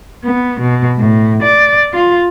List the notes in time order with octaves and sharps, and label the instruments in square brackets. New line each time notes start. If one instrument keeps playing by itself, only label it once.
[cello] B3
B2
A2
D5
F4